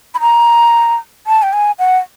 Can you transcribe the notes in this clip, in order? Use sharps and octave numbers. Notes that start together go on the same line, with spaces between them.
B5
A#5
A5
G5
G#5
F#5